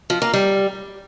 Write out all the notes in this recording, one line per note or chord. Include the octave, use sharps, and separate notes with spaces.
F3
A#3
G3